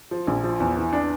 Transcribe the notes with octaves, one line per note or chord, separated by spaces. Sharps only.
F3
A#1
F3
E2
E3
D4